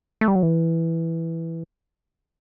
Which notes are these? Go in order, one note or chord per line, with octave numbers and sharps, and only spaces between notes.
A3
G3
F#3
E3